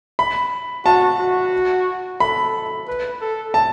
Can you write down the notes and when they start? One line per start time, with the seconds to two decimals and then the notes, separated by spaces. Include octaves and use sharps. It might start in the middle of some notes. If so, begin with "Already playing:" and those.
0.19 B5
0.85 F#4 A5
1.20 F#4
2.20 A4 B5
2.88 B4
3.21 A4
3.54 A5